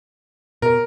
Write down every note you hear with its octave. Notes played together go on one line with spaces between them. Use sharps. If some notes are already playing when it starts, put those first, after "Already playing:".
B2 A#4